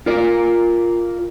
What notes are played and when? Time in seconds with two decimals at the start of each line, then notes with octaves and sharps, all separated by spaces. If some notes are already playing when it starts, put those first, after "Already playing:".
0.06 F4 A#4 D5